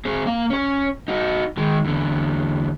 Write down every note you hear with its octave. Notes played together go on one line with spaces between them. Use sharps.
C4 G#4
A#3 F5
C#4 C#5
D#4 F#4
D#3 G#3
E2 D3